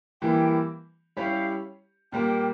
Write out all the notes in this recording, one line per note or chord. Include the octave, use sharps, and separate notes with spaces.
E3 G3 A#3 E4 G5
G3 C#4 E4 G4 C#5 F5
A#2 G3 A#3 G5